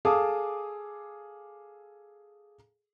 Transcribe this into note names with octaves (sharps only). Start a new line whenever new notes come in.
G#4 A4 F5 A5 D6 D#6